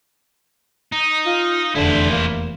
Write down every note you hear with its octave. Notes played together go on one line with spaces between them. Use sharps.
D#4
F4
F1 E2 D3 E4 C5
A#3